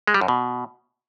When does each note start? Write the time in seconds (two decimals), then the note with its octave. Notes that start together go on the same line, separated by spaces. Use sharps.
0.08 G#3
0.14 G3
0.21 F#2
0.28 B2